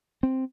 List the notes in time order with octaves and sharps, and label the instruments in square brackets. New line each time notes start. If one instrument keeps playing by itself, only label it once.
[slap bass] C4